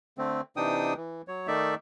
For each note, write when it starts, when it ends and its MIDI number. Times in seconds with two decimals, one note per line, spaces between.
0.18 0.41 50
0.18 0.41 57
0.18 0.41 60
0.56 0.94 48
0.56 0.94 52
0.56 0.94 62
0.56 0.94 63
0.56 0.94 79
0.56 0.94 87
0.97 1.22 52
1.28 1.47 54
1.28 1.47 73
1.47 1.75 51
1.47 1.75 57
1.47 1.75 63
1.47 1.75 74
1.47 1.75 76